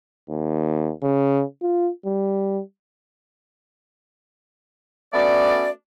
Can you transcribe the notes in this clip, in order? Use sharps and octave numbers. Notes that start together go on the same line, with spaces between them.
D#2
C#3
F4
G3
A3 B3 C#4 F#4 D5